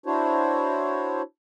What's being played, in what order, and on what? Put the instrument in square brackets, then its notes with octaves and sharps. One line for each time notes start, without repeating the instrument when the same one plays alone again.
[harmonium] D4 E4 F#4 C5 C#5